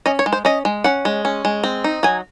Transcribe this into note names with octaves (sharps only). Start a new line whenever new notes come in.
C#4 D#5
C#5
G#3
C5
C#4 D#5
G#3
C#4 F#5
G#3
C#4
G#3
C4
D#4
F#3 G#5